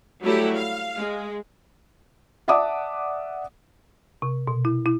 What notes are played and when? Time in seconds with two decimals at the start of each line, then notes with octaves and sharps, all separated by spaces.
0.23 F#3 G3 A3 E4 G4
0.56 F5
0.98 G#3
2.48 D5 E5 F#5 A5 D6 D#6
4.22 C3
4.48 B2
4.65 E4
4.86 E4